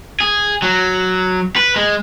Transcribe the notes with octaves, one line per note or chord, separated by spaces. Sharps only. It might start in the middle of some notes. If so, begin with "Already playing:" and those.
G#4
F#3
B4
G#3